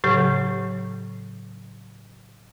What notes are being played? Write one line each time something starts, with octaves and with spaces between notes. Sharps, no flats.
A2 C#3 F#3 G4